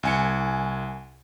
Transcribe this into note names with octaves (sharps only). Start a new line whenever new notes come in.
C2 G#5 C#7